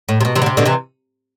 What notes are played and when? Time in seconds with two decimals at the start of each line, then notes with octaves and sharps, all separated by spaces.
0.09 A2
0.21 C3
0.25 B2
0.35 C3 E3
0.42 D3
0.46 C3
0.57 B2 D3
0.65 C3 E3